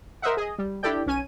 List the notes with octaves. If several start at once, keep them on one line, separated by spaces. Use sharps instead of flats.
A#4 C5 D#5 E5 F#5
G#4 D#5
G3
D4 E4 G4 A4 D5 G5
B1 C#4 G#5 D#7